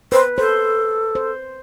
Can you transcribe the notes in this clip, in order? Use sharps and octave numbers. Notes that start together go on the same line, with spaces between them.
B4 C5
A4 C5
C5